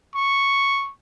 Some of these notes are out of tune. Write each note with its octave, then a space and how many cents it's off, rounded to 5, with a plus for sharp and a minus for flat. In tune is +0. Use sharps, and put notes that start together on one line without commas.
C#6 +0